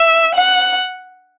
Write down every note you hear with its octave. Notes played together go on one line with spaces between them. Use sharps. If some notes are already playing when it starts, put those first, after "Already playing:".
Already playing: E5
F#5